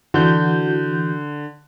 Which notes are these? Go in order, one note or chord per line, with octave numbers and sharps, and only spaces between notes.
D3 E3 F#4 G6